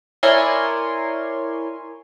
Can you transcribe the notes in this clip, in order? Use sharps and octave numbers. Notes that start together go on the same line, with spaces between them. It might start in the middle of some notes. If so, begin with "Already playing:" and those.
E4 A#4 C#5 D5 G#5 C6